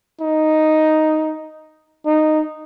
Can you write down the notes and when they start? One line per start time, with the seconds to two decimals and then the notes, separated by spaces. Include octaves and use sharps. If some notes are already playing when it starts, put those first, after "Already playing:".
0.21 D#4
2.06 D#4